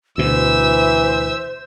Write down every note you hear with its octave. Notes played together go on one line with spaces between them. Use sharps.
D2 B2 E3 C5 E5 E6